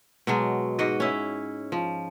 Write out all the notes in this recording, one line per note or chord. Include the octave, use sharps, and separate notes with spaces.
B2 F#3 G#3
G#2 F#4 D#5
C#4 E4
F3